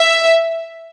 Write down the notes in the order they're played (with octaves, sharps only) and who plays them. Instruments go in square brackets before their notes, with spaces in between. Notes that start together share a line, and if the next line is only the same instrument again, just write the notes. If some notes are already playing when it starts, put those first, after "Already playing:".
Already playing: [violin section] E5